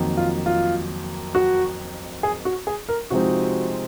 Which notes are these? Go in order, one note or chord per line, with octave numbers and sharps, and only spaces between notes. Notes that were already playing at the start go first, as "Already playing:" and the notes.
Already playing: F2 D#3 F#3 A#3 D#4
F4
F4
F#4
G#4
F#4
G#4
A#4
C3 F3 G#3 C4 D#4 F#4